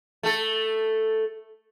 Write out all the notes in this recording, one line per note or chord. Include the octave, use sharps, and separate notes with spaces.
A3 A4